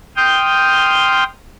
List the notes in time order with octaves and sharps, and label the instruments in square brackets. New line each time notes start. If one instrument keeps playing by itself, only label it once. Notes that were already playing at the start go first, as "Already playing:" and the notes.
[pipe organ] G5 C6 D#6 F6 G6